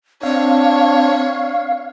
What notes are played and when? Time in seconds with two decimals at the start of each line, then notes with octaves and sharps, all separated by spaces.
0.23 C4 D4 C#5 F5